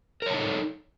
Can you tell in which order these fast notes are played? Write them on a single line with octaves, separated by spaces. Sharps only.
A#4 C#5 A5 D#4 A4